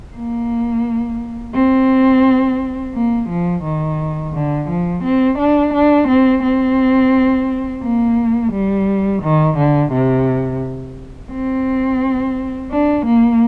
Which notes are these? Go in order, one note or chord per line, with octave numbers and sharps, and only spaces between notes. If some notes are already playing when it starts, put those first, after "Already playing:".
A#3
C4
A#3
F3
D#3
D3
F3
C4
D4
D4
C4
C4
A#3
G3
D#3
D3
C3
C4
D4
A#3